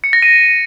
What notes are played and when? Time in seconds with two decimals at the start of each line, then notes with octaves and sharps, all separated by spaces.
0.04 C#7
0.13 A#6
0.23 D#7